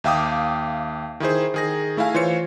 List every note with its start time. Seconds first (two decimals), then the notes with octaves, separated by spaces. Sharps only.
0.04 D#2 E5 F5 G5 D6 D#6
1.20 D#3 E4 G#4 C5
1.54 D#3 G#4 A#6
1.97 A3 E4 E5 F5 G#5
2.14 E3 F4 C5 C#5 C#7